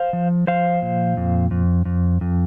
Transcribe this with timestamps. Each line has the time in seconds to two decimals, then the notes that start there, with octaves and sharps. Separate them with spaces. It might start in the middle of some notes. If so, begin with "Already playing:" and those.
Already playing: C5 F5
0.13 F3
0.47 F3 C5 F5
0.82 A#2
1.17 F2
1.51 F2
1.85 F2
2.21 F2